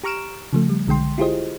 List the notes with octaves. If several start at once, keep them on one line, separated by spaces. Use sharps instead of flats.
G4 A#5 C#6 F6 D7 E7
C#3 F3 A3
G3
B1 D3 G#3 G5 C6
E4 F4 G4 G#4 C5 D#5